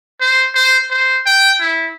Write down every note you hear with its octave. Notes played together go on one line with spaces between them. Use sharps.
C5
C5
C5
G5
E4